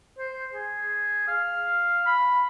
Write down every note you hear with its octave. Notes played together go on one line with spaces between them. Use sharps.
C5
G#4
F5
B5